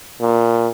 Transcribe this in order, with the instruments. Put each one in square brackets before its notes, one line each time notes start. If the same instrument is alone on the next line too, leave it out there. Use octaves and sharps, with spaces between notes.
[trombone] A#2